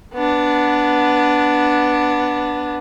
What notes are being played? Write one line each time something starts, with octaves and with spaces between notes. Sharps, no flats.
B3 D4